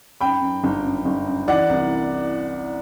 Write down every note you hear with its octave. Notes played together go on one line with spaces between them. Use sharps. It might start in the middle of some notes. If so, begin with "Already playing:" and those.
F#2 G5 B5
F#2
G1
F#2
G1
F#2
E3 D5 F#5
C2